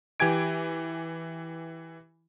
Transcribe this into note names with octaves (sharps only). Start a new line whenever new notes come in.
E3 G4 G#5 G#6 D7